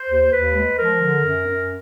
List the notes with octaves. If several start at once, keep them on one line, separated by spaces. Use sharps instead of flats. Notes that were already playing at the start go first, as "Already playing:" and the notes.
Already playing: C5
D#2
D#2 B4
G#3
F3 A#4
D3
F#2
F#2